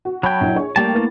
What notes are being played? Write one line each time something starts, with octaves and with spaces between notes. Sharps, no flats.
F#4
F#3 G5 A5 B5 C#6
A#1 E4
G#4 C#5
G3 A3 A#3 G5 A5
B3 E4 A6